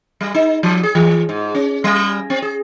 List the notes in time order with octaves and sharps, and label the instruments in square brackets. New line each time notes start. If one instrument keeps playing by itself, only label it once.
[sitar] G3
D#4
F3
G#4
E3
G#2
C#4
G3
C4
G#4